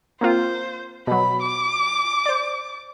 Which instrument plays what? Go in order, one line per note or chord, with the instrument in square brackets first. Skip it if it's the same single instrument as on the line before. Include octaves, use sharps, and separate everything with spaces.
[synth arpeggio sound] A#3 C4 F4 [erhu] C5
[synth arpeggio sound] B2 F#3 [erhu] B5
[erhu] D6
[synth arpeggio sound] C5 D5